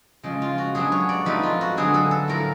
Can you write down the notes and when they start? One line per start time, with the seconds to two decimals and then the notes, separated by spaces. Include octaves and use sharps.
0.23 C#3 F3 G#3
0.42 F4
0.58 F#4
0.75 F#3 B3 D4 G#4
0.92 C#5
1.09 D5
1.26 F3 A3 C4 D#4 B4
1.43 F4
1.61 F#4
1.77 D3 F#3 B3 G#4
1.94 A4
2.11 A4
2.28 A2 F3 A3 A#4